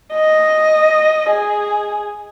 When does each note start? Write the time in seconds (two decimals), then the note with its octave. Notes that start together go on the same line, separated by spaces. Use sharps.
0.14 D#5
1.30 G#4